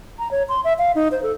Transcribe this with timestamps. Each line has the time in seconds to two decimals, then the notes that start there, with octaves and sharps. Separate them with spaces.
0.19 A#5
0.31 C#5
0.49 C6
0.64 E5
0.78 F5
0.95 D#4
1.12 C5
1.23 A4